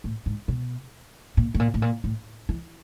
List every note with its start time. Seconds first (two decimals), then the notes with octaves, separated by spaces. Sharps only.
0.04 A2
0.26 G#2
0.48 B2
1.37 A#2
1.54 A2
1.60 A#2
1.74 A2
1.82 A#2
2.04 A2
2.49 E3